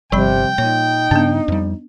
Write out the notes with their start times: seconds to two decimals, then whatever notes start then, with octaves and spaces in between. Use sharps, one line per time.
0.12 G1 C3 F3 G3 G5 B5
0.58 A#2 D#4 C#5
1.11 G2 C#3 B3 D4
1.48 F2 G3